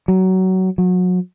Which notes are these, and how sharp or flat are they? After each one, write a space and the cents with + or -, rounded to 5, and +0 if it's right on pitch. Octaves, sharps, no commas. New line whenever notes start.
F#3 +20
F#3 -30